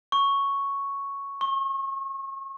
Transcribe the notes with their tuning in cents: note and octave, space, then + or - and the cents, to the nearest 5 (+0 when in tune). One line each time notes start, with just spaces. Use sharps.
C#6 +0
C#6 -35